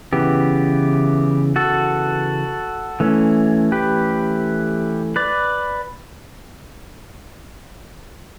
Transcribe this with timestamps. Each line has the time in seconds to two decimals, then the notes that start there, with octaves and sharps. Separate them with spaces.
0.13 C#3 E3 B3 G4
1.56 F#4 A4
3.00 E3 A3 C#4
3.72 G4 B4
5.16 B4 D5